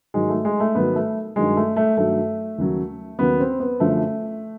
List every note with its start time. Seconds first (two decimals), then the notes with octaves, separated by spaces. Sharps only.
0.14 G#2 D#3 F#3 G#3
0.29 A3
0.45 G#3
0.60 A3
0.75 G#2 D#3 F#3 B3
0.96 A3
1.36 G2 D#3 F#3 G#3
1.56 A3
1.76 A3
1.97 G2 D#3 F#3 A3
2.58 D#2 C#3 F#3
3.19 D#2 C#3 F#3 B3
3.40 C4
3.60 B3
3.80 F#2 D3 F3 A3